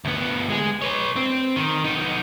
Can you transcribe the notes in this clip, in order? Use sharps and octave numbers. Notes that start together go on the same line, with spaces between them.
D2 B3
G#3 G#4
B4 C#5
C4
D#3
B3 D#4